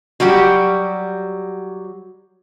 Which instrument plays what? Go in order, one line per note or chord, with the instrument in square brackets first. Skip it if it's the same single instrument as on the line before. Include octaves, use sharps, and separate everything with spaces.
[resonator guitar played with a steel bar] F#3 G3 F#4 G4